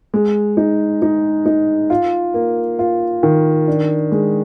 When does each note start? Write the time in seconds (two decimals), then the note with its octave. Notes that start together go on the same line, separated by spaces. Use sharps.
0.14 G#3
0.57 D#4
1.02 D#4
1.46 D#4
1.90 F4
2.34 A#3
2.79 F4
3.23 D#3
3.68 D4
4.12 G#3